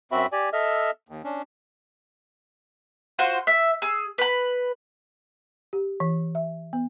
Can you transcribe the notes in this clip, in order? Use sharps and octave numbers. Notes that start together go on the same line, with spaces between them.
F#2 C4 F#4 E5 B5
G4 D5 G#5
A4 D#5 E5 F6
D#2
C#4 D4
F4 F#4 C5 F#6
E5
G#4 E6
B4 B5
G4
E3
E5
B3